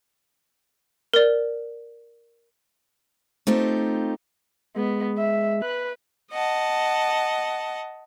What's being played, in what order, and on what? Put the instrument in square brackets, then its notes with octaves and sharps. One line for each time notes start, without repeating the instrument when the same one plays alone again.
[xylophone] A#4 D5
[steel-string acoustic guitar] A3 C4 D#4 F4 G4
[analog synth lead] G#3 [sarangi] B3
[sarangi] E5
[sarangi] B4 [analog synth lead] F#6
[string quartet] D#5 F#5 A5